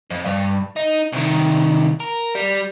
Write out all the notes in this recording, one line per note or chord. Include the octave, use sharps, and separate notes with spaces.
F2
G2
D#4
C2 D#3
A#4
G3